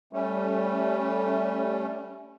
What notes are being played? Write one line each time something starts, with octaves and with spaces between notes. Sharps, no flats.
G3 A3 C#4